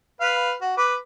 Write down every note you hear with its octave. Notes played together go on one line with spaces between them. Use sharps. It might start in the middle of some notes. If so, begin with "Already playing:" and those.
B4 F5
F#4
B4 D6